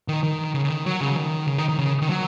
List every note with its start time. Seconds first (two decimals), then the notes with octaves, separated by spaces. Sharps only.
0.08 D#3
0.23 D#3
0.54 C#3
0.64 C#3
0.69 D#3
0.86 F#3
1.01 C#3
1.17 D#3
1.47 C#3
1.58 D#3
1.69 D#3
1.79 C#3
2.02 D#3
2.09 F#3